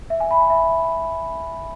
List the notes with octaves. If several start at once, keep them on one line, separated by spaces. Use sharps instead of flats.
E5
G#5
B5
G#5
E5